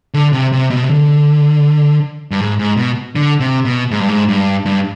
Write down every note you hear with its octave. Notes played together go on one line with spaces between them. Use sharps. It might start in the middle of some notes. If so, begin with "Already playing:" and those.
D3
C3
C3
B2
C3
D3
G2
G#2
G#2
B2
D3
C3
B2
G#2
G2
G#2
G2
G2